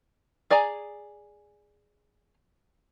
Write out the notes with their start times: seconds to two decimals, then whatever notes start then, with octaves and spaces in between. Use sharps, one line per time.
0.50 G#4 D5 G#5 A#5